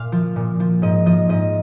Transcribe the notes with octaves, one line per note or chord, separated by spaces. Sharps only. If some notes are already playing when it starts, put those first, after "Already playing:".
Already playing: A#2 F5
F3
A#2
F3
G#2 D#5
F3 D#5
G#2 D#5